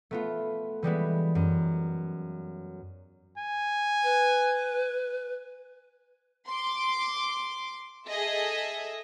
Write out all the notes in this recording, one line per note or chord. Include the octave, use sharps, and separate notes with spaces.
A3 B3 F4
E3 G3 G#3 B3
F#2
G#5
B4
C6 D6
G#4 A4 D#5 E5